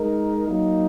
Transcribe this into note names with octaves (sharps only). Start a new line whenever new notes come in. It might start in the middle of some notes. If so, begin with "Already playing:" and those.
Already playing: G#3 D#4 A#4
F#3 A#3 D#4